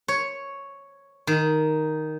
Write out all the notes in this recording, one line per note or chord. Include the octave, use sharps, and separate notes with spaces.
C#5
D#3